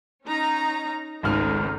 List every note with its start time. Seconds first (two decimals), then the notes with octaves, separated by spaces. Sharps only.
0.25 C#4 D#4 A#5
1.23 G#1 C#2 A3 D#4 F6